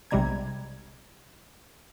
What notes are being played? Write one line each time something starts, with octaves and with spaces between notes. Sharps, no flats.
B1 C3 G3 G#3 A#5 G#6